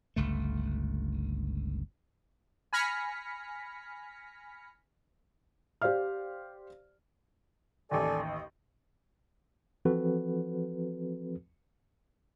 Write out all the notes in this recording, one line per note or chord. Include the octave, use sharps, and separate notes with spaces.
G1 C#2 A3
G#5 B5 F6 A#6 B6 C#7
G4 C5 D5 F5 F6
A1 D#2 A4 D5 G#5
D#5
E3 F3 C4 F#4 A4 B4